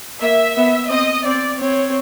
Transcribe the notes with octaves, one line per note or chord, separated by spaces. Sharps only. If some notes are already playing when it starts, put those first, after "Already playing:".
A#3 E5
B3
C4 D#5
C4 D5
C4 C#5